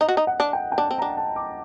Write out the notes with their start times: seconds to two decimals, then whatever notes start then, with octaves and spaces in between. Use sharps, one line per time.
0.01 D#4 D#5
0.09 F#4
0.17 D#4
0.27 F#5
0.40 D4
0.53 G5
0.72 G5
0.78 D4 A5
0.91 C4
0.98 D4 A#5
1.17 A5
1.36 D6